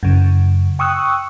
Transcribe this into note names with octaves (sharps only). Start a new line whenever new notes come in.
F#2 C#3
G5 C#6 D#6 E6 F#6